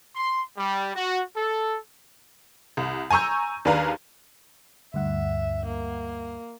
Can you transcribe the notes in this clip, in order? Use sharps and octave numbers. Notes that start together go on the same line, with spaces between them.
C6
G3
F#4
A4
C2
G#5 A#5 C#6 E6 G6
D#2 D4 G#4 B4 F5 A#5
D2 G2 E5 F#5
A#3